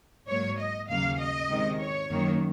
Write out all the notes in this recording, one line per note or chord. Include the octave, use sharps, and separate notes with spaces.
G#2 F#3 A#3 C#5
D#5
D#2 C#3 F#3 A#3 F5
D#5
C3 D#3 G#3
C#5
F#2 D#3 F#3 A#3